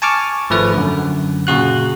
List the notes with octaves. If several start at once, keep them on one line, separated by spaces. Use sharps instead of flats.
G#5 A5 C#6 D6 F6
G#1 F3 A3 B4
F#2 D3
A#2 C#3 F#4 F#6